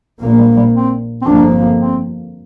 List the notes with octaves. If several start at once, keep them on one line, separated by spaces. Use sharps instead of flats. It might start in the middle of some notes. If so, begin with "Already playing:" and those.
A#1 A#2 A#3
G3
G3
C4
C4
G1 F2 F3 A#3 D4
C4